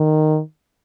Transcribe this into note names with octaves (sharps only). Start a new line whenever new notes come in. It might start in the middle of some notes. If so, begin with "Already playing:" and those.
Already playing: D#3